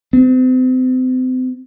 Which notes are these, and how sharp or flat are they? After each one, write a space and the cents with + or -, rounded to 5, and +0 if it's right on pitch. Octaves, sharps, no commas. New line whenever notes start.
C4 -40